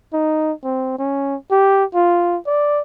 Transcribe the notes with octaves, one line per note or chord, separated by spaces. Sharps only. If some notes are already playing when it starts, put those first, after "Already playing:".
D#4
C4
C#4
G4
F4
D5